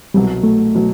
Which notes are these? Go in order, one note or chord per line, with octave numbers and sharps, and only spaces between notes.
C2 B2 F#3 G3
A3
B2 F#3